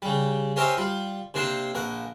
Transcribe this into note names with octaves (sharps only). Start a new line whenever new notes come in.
C#3 G3
C#4 G4 A#4 C5 D#5 E5
G3 F4
C3 A#3 D4 C5
A#1 A#4 F#5